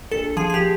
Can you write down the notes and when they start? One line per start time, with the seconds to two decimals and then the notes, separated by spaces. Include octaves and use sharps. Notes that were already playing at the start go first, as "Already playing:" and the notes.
0.11 A#1 A4
0.37 F3 G#4
0.50 G#4
0.54 G4